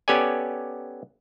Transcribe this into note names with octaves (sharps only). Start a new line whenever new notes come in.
B3 C#4 G4 A4 D5 G#5